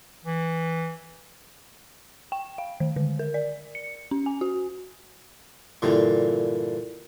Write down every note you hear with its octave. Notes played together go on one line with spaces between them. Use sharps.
E3
G5
F5
D#3
D3
A#4
D5
C#7
C#4
G#5
F#4
G2 A#2 D3 E3